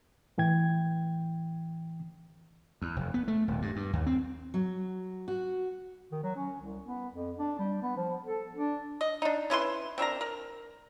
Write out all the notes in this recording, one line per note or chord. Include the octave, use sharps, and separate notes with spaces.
A2 E3 G5 G#6
E2
F1
B3
A3
D#1
G2
G2
D#2
C4
F#3
F#4
D#3
F#3
C#4
C2
B3
F2
D4
G3
B3
F3
A4
D4
D#5
D4 D#4
C#4 E4 B4 C6
C4 D4 A#4 A#5
A#4